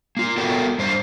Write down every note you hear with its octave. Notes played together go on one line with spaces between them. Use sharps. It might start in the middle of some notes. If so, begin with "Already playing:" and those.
A#3 F4
B3 F#4 A4 A#4 D5 G5
G2 D4 C5